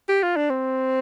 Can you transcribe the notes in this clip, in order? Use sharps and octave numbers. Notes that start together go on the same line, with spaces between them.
G4
F4
D4
C4